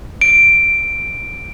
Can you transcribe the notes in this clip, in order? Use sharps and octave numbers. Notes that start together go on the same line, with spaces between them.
D7